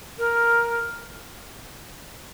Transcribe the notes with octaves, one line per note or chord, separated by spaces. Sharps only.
A#4